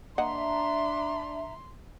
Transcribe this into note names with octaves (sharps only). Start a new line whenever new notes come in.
A#3 D4 D#5 E5 F#5 A#5 C6